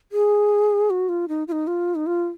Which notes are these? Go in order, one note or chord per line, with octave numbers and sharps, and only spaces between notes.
G#4
F#4
F4
D#4
F4
D#4
F4
D#4
F4